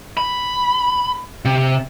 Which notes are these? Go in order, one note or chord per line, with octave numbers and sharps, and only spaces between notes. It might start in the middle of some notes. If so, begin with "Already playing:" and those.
B5
C3